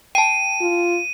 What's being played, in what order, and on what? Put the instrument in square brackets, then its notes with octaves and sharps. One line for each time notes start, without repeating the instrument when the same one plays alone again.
[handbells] G5 A5 [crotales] D#7
[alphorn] F4